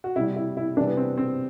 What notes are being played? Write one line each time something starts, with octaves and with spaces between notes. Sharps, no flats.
F#4
C3 G3 E4
E4
E4
C3 E3 G3 D4
B3
C4
C4